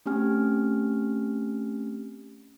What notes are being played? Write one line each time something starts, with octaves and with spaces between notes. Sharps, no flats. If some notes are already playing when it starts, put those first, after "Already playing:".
A3 C4 C#4 G4 G#5 F6